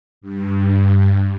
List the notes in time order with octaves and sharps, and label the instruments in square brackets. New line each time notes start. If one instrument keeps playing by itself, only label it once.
[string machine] G2